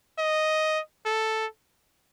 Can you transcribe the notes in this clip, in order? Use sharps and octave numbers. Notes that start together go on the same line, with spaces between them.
D#5
A4